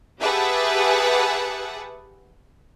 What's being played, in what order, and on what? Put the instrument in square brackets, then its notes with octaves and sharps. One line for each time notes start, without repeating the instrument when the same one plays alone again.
[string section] G4 G#4 B4 E5 F#5 A5